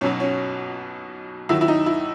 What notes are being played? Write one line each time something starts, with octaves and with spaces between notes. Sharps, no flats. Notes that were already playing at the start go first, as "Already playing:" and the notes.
B1 B2 F#3 C#4
C#4
D#2 D#3 F#3 E4
E4
D#4
E4